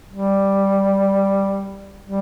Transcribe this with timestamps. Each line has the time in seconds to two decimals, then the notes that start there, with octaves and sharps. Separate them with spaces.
0.11 G3
2.05 G3